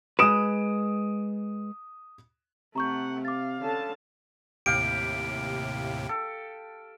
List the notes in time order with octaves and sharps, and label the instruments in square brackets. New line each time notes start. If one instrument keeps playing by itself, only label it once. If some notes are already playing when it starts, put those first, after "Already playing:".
[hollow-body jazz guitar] G#3 B4 [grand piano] D#6 D7 E7
[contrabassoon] C3 [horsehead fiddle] A3 F#5 [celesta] A#5 C#6 G6
[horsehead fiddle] F5 [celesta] D6 A6
[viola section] D3 C#4 A5
[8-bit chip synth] D#2 A2 C3 [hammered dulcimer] G4 F5 [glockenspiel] D7
[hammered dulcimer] A4